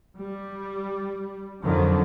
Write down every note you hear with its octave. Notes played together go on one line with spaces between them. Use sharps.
G3
F2 D3 D#3 F3 F#3